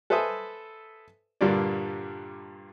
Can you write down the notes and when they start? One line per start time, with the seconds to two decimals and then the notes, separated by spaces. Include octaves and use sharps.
0.10 A4 B4 C5 E5 G#5 D#6
1.41 G2 A#2 D3 G3 A#3 D5